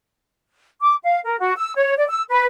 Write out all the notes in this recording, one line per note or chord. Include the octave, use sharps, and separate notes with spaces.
D6
F5
A#4
F#4
E6
C#5
D5
E6
B4